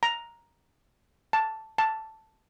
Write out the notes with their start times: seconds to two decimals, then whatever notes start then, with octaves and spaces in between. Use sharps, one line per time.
0.03 A#5
1.33 A5
1.78 A5